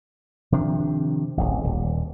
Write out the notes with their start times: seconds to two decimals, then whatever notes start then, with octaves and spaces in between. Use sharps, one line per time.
0.52 C3 D#3 F3 D4
1.37 D1 A1
1.64 D#1